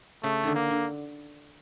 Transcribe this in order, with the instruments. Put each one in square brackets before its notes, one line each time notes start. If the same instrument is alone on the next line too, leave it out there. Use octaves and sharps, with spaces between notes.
[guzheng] C#3 [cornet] A3
[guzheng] D3 D#3
[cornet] A#3
[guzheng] D3